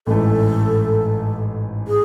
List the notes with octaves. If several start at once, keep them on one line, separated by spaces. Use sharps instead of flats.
A1 G#2 E3 A3 A4
G#4